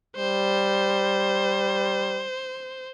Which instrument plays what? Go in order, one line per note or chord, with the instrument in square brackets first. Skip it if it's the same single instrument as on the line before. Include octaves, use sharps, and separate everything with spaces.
[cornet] G3 [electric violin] C5